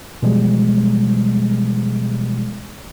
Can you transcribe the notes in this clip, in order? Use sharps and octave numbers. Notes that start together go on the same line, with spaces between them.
B2 E3 F3 G3 G#3